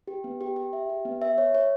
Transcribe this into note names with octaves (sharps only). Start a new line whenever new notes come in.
G4
B3
G4
G4
E5
G4
B3
E5
C#5
C#5